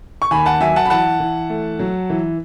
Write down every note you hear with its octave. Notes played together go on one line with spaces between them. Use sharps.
C#6
D#2 G#5 B5
F#5 A5
F#3 E5 G#5
F#5 A5
B5
E3 F#5 A5
E3
A3
F#3
E3